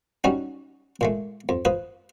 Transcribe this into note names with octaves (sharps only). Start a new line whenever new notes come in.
G3 C#4 D#4 F#4
A#2 G#3 A3
F2
F3 B4 D#6